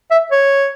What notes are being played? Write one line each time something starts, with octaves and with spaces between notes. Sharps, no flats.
E5
C#5